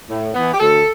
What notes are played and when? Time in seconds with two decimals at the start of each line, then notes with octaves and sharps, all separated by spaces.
0.10 A2
0.34 E3 B3
0.54 G4
0.60 D2 A4